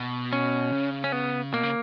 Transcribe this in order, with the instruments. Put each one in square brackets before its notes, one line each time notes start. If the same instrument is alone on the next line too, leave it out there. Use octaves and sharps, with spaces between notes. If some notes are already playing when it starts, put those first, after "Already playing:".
Already playing: [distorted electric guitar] B2
[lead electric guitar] C#4
[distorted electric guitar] C#3
[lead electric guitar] C#4
B3
[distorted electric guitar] B2 [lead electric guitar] A#3
[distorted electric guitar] C#3